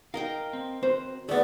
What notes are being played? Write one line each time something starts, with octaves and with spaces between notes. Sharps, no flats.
A#4 D#5 F5 G5
C4
C4 F#4 C5
A3 B3 G#4 D5 E5